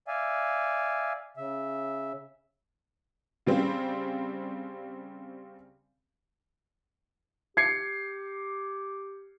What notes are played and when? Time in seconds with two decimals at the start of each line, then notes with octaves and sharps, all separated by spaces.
0.07 D5 E5 F5 G#5
1.37 C#3 E5
3.46 C#3 G3 C4
7.57 G4 G#6 C7 C#7